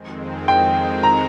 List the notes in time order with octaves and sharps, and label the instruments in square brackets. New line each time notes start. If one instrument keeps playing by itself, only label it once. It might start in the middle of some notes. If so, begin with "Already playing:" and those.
Already playing: [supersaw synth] F2 D#3 G#3 C4
[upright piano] G5
A#5